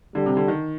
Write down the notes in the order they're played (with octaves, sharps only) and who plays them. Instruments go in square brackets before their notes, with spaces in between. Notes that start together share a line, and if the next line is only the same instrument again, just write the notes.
[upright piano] D3 [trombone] G3
[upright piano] C3
D3
D#3